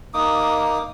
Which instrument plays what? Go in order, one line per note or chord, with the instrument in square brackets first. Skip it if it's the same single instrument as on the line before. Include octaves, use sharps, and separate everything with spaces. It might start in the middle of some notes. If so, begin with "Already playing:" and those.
[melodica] A#3 D#4 D6 D#6